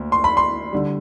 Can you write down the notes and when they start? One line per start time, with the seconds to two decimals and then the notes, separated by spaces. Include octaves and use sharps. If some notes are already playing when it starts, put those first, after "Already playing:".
Already playing: D2 A#3
0.12 C6
0.24 B5
0.37 C6
0.72 D3 G3